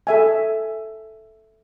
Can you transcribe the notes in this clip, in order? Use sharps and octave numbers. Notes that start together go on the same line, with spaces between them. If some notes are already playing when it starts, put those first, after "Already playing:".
A4 E5 G#5